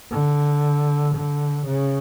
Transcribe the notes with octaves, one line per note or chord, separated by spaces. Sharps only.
D3
D3
C#3